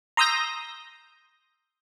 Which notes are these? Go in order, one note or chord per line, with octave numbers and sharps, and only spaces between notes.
A#5 C6 D#6 E6 G6 A#6